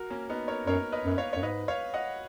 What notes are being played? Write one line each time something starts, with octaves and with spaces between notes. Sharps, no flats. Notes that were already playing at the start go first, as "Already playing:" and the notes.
Already playing: F#4 A#4
A#3 C#4
B3 D#4
A#4 C#5
F#2 A#4 C#5
B4 D#5
F#2
C#5 F5
F#2 C#5
G#2 B4 D#5
C#5 F5
D#5 F#5